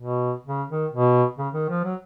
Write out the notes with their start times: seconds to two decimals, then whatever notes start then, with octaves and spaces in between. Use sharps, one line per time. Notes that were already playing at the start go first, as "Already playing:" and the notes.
0.01 B2
0.47 C#3
0.70 D#3
0.92 B2
1.38 C#3
1.54 D#3
1.69 F3
1.84 F#3